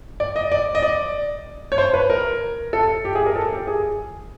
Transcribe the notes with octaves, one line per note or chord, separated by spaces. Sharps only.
D5
D#5
D5
D#5
D5
C#5
C5
B4
A#4
A4
G4
G#4
A#4
A4
G4
G#4